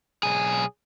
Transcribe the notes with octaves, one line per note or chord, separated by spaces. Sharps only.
B1 G#4